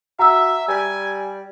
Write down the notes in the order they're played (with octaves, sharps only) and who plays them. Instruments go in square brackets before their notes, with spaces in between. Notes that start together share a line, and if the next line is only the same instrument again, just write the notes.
[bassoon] F#4 [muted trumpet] E5 [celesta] A#5 E6
[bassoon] G3 [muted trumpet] G#5